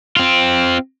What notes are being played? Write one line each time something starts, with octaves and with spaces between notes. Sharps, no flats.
C4 F4